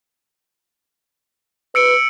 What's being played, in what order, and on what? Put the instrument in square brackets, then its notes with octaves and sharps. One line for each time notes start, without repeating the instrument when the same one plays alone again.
[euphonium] B4 [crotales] E6 C#7 D7